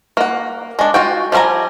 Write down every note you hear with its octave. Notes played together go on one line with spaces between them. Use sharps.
A#3 F#5
G#3 D4
F4 F#4 G5
F3 G3 F4 G#5 A#5